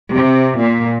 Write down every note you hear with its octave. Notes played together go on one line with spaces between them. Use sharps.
C3
A#2